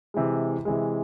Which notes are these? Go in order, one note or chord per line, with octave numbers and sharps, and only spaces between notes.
C3 E3 G#3
C3 E3 G#3